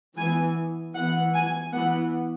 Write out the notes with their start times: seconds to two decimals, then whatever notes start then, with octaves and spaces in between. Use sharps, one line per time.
0.18 E3 B3 G#5
0.95 E3 B3 F#5
1.34 G#5
1.72 E3 B3 F#5